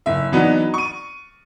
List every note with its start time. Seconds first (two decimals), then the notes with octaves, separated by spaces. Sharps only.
0.06 F#1 E5
0.32 E3 F#3 B3 D4 D#4
0.74 C#6 D#7